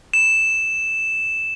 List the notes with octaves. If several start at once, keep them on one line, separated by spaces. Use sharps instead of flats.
E7